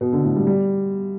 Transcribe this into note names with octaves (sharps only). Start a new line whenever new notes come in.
B2
D3
A2
G3
G3